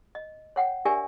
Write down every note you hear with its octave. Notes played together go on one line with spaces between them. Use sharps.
D#5
C#5 F#5 G5
D4 G4 A#4 D5 E5 G#5